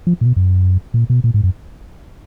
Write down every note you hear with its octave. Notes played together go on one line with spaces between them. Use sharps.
F3
A#2
B2
F#2
A#2
B2
A#2
G#2
F#2